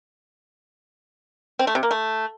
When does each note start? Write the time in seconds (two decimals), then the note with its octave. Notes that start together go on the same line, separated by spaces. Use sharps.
1.59 C4
1.67 A3
1.75 C3
1.83 A#3
1.91 A3